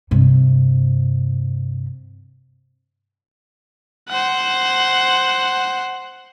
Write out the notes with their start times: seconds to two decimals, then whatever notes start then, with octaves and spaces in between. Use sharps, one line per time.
0.11 G2 C3
4.09 C5 F#5